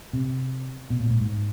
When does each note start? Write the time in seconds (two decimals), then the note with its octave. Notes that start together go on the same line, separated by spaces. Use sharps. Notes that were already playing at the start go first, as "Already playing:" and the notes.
0.13 C3
0.90 B2
1.00 A#2
1.10 A2
1.21 G#2